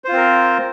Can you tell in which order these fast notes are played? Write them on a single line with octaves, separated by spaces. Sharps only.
C5 F4 C4 A#4